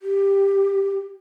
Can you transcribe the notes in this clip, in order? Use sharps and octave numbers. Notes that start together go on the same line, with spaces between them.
G4